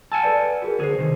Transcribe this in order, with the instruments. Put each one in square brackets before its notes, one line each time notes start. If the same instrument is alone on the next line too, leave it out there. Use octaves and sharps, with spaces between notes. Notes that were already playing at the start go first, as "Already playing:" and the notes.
[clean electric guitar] F#5 G#5 A5 [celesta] E6 F6
[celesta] A4 B4 D5
F#4 G#4 A#4
[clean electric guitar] D2 G#4 [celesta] A#4 C5 C7
[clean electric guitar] C3 D#3